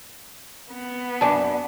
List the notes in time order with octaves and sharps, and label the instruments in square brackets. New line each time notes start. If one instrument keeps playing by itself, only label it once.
[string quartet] B3
[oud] F#2 D4 [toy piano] G#5 A5